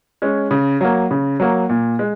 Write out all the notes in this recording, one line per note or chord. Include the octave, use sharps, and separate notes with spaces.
G#3 C#4
C#3
F#3 A#3
C#3
F#3 A#3
A#2
G#3